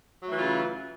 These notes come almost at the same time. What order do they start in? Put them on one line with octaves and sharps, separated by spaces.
F#3 A3 E3 F4 C#3